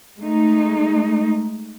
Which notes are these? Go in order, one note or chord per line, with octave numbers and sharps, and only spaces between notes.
G#3 A3 D#4